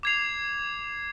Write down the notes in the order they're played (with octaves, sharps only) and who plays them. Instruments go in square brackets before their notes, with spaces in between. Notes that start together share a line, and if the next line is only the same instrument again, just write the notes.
[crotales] D6 G#6 C7 F7